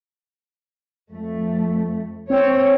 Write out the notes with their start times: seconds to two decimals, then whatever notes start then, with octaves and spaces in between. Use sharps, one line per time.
1.11 F2 A3
2.30 C4 C#5